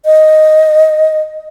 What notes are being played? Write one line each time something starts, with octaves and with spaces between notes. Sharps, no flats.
D#5